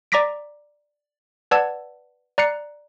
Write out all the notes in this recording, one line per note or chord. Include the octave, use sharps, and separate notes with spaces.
D5 A#5 D6 A#6 B6 D7
B4 D5 F#5 A5 E6 G#6
D5 A#5 F#6 C7 C#7